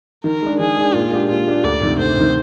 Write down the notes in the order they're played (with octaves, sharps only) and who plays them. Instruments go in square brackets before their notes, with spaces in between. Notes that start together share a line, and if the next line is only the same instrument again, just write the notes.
[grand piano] D#3 [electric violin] A#4
[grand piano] G#3 D4
[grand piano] D#3 [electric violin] G#4
[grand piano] G#3 D4
[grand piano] A#2 [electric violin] F4
[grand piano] G#3 D4 G4
[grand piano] A#2 [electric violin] F4
[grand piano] G#3 D4 G4
[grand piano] D2 [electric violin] D5
[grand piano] C3 D#3
[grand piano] D2 [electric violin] C5
[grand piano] C3 D#3